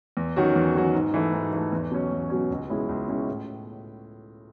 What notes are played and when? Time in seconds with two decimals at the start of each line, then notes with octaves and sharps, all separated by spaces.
0.17 E2
0.36 D#3 F#3 C#4 F#4
0.56 E2
0.75 D#3 F#3 C#4 F#4
0.94 G#2
1.14 E3 A3
1.33 G#2
1.53 E3 A3
1.72 E2
1.91 B2 F#3 C#4
2.12 E2
2.30 B2 F#3 C#4
2.50 C#2
2.69 B2 G#3 C#4 E4
2.89 C#2
3.08 B2 G#3 C#4 E4
3.28 A2